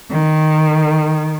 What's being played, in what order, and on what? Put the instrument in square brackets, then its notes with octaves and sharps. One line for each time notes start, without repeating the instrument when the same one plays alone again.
[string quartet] D#3